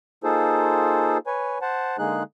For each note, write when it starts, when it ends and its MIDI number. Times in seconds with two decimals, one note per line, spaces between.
0.24 1.18 58
0.24 1.18 63
0.24 1.18 65
0.24 1.18 68
0.24 1.18 69
0.24 1.18 72
1.27 1.58 71
1.27 1.58 73
1.27 1.58 80
1.62 1.97 72
1.62 1.97 78
1.62 1.97 81
1.99 2.23 50
1.99 2.23 56
1.99 2.23 58
1.99 2.23 63
1.99 2.23 68
1.99 2.23 90